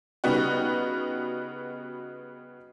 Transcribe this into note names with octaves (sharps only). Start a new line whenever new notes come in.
C#3 G3 B3 D#4 F#4